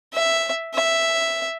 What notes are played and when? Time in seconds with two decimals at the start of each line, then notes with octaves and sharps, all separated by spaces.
0.14 E5
0.74 E5